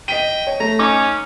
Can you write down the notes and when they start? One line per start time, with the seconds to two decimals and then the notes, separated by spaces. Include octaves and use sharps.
0.08 D#5 G5 B6 D#7
0.47 C#5
0.60 A3 A#5
0.79 C#4 D#4 D6